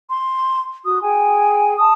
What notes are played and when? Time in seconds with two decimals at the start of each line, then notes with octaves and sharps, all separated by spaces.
0.10 C6
0.85 F#4 D#6
1.03 G#4 G5 G#5
1.78 A5 D#6